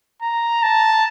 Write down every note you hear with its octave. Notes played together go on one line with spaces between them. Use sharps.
A#5
A5